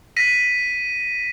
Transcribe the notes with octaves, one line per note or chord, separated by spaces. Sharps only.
A#6 B6 D#7